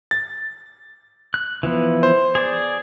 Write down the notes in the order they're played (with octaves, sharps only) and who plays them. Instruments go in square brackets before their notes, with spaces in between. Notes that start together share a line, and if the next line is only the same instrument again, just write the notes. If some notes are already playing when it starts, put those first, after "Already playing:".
[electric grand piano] A6
[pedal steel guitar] F#6
E3 F3 B3
[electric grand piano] C5
[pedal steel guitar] G#4 D5